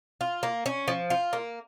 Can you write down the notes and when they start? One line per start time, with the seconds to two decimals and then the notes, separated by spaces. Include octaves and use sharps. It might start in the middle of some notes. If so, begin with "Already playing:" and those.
0.21 F4
0.43 A#3
0.66 C#4
0.88 F3
1.10 F4
1.33 A#3